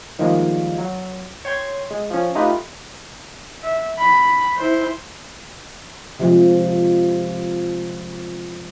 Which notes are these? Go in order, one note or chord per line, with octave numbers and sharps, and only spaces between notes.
D#3 F3 G3 G#3 A#3
F#3
C#5 G5 C6 G#6
G#3
F3 C#4
A3 D#4 F4 G4 B4
E5
B5
E4 C5
C3 F3 G#3